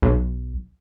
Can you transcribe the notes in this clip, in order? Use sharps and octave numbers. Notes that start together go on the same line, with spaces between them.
B1